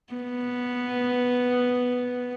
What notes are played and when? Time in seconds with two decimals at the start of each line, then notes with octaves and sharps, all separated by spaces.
0.14 B3